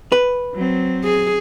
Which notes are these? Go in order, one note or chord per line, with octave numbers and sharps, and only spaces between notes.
B4
F#3 C4
G#4